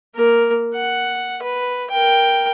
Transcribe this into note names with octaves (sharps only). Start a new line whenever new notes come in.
A#3 A#4
F#5
B4
A#4 G5